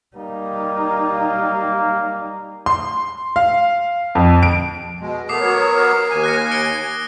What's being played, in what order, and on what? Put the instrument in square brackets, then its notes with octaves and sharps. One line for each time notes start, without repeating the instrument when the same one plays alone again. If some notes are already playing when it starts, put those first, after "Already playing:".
[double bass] G3 D#4 [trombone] A#3
[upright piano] C6
F5
F2
D7
[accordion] B2 G#3
[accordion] A3 B3 [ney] A#4 [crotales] D6 D#6 C7
[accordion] F#3 B3 C#5
D#2 G#5
[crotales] F#6 A#6 C#7
C#7 D7 G7